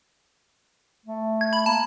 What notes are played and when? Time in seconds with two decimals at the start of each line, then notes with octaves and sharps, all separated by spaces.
1.06 A3
1.41 G#6
1.53 B5
1.66 A#3 A5